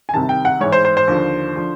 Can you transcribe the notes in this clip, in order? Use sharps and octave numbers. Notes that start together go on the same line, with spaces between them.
G#5
C2 C3 D#3 A5
G5
F#5
G#2 E3 C#5
C5
C5
C5
D#2 D3 F3
D3 F3